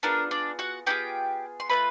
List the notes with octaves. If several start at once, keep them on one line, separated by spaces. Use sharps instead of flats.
B3 D4 F4 G#4 A#4
D4 D5
F#4 F#5
B3 D4 F4 G4 G#4 G5
C6
A3 D4 F4 B4 B5